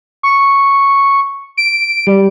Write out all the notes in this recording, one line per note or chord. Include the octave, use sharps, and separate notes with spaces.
C#6
D7
G3